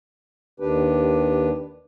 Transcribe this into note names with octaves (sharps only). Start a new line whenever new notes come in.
D#2 D#3 D4 G4 B4